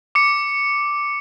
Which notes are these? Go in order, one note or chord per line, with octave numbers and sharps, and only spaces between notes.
D6 C#7